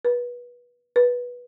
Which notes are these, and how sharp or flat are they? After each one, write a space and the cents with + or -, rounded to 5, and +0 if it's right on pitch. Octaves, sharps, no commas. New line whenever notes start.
B4 -25
B4 -15